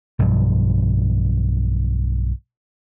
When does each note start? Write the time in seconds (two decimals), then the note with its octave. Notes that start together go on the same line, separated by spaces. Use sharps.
0.19 B1 G2 F3